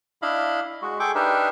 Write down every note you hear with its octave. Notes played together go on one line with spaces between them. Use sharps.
D4 E4 D#5 F5 B5
G#3 F#4
G#4 A4 G5 C#6 D6
D4 D#4 G4 A#4 B4 E5